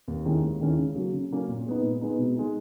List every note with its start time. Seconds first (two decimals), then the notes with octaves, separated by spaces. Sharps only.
0.08 D#2
0.25 D#3 G#3 C#4 E4
0.43 D#2
0.61 D#3 G#3 C#4 E4
0.78 C#3
0.95 F#3 A#3 C#4
1.13 C#3
1.31 F#3 A#3 C#4
1.48 A#2
1.66 G#3 B3 D#4
1.83 A#2
2.01 G#3 B3 D#4
2.18 B2
2.36 G#3 D#4